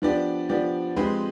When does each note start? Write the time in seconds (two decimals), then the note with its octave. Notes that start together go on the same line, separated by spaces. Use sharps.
0.02 F3 B3 D4 G4 D5
0.49 F3 B3 D4 G4 D5
0.96 F3 G#3 C4 G4 B4